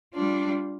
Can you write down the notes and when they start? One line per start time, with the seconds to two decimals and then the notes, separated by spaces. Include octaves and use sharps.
0.14 G3 D4 F4